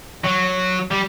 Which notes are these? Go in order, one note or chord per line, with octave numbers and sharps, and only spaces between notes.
F#3
G3